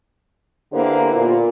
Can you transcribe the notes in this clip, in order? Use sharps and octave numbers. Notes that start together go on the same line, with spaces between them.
D3 A#3 B3 E4 G4 C5
A#2